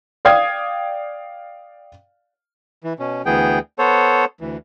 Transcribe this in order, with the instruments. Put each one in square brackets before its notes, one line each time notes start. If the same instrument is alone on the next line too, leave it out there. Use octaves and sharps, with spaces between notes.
[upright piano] D5 F5 G5 D#6 G#6
[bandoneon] E3
B2 C#4
D2 E3 B3 G#4 G5
B3 A4 C5 C#5
D2 E3